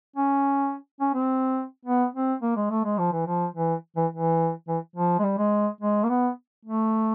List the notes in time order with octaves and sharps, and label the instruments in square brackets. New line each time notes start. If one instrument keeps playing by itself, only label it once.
[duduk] C#4
C#4
C4
B3
C4
A#3
G#3
A3
G#3
F3
E3
F3
E3
E3
E3
E3
F3
G#3
G3
G#3
G#3
A#3
B3
A3